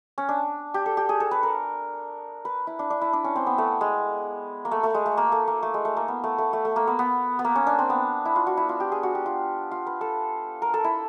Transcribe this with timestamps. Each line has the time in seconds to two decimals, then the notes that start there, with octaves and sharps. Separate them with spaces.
0.18 C#4
0.29 D4
0.74 G4
0.86 A4
0.97 G4
1.09 G#4
1.20 A4
1.31 B4
1.43 A#4
2.45 B4
2.67 E4
2.79 D4
2.90 D4
3.01 E4
3.13 D4
3.24 C#4
3.36 C4
3.46 B3
3.58 A3
3.81 G#3
4.65 A#3
4.71 A3
4.83 A3
4.94 G#3
5.06 A3
5.17 A#3
5.32 A3
5.48 A#3
5.63 A3
5.74 G#3
5.85 A3
5.97 A#3
6.08 B3
6.24 A3
6.38 A3
6.53 A3
6.65 A3
6.76 A#3
6.87 B3
6.99 B3
7.39 B3
7.44 A#3
7.55 C#4
7.67 D4
7.79 C4
7.90 B3
8.25 E4
8.36 F4
8.47 F#4
8.57 E4
8.69 F4
8.80 G4
8.92 G#4
9.03 F#4
9.15 G4
9.26 F4
9.71 F4
9.87 B4
10.01 A4
10.62 A#4
10.74 A4
10.84 E4